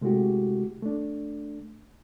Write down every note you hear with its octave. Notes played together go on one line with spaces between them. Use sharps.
C3 G#3 A3 E4 F#4 G4
A3 D4